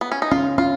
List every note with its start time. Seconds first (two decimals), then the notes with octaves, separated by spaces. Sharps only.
0.01 B3
0.12 C#4
0.22 D#4
0.31 C#4 F4
0.58 C#4 F4